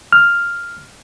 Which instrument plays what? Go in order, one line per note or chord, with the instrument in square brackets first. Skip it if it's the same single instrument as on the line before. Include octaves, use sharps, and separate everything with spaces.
[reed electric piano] F6